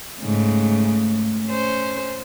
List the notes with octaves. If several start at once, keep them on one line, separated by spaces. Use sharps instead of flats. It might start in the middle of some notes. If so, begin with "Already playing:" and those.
G#2 C#3 A3
C#4 C5